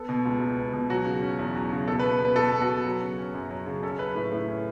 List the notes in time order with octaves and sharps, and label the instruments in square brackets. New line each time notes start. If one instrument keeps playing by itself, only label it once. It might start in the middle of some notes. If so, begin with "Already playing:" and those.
Already playing: [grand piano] B3 A4
B2
C#2
C#2
B3
B2
F#3 F#4
C#3
C#4
E2
F#3
C#3
B2 A4
B4
B3
B3 B4
B2 A4
B2
F#4
B3
F#3
C#3
C#4
F#2
F#3
C#3
C#4 A4
F#3 B4
A2 B4
A2
C#4